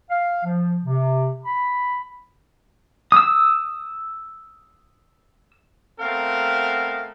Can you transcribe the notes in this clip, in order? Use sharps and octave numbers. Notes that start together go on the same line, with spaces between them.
F5
F3
C3
B5
D#6 E6
A3 B3 C4 A#4 F5